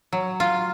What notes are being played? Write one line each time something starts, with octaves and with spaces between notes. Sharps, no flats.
F#3
F4